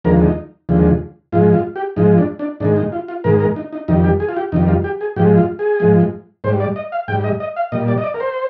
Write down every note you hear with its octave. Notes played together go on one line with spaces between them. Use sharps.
D#2 D3 F3 G#3 A#4
D#4
D#2 D3 F3 G#3
G#2 F3 G#3 F4
F4
G4
G#2 F3 G#3 D#4
D4
D4
G#2 D#3 G#3 D4
D#4
F4
F4
G#2 D#3 G#3 A#4
A#4
D#4
D#4
F2 D#3 G3 D#4
G4
G#4
F4
G4
F2 D#3 G3 D#4
F4
G4
G#4
G#2 F3 G#3 G4
F4
G#4
G#2 F3 G#3
G#2 G3 C5
D5
D#5
F5
G#2 G3 G5
D#5
D#5
F5
A#2 G3 D#5
D5
D#5
D5
A#4
C5